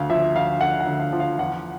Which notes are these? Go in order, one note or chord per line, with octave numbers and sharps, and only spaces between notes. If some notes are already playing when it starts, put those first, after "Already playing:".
Already playing: D2 F5
F3 E5
D2 F5
D3 F#5
F#5
D2
F5
F3
F5
E2 F#5